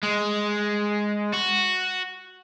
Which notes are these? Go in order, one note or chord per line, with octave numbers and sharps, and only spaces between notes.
G#3
F#4